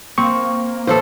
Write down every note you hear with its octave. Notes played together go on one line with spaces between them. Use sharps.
A#3 C4 C#6
A2 E3 A4 C5